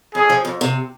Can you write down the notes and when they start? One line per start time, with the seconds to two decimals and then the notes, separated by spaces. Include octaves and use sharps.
0.14 F2 G#4
0.30 F3
0.45 F2
0.61 C3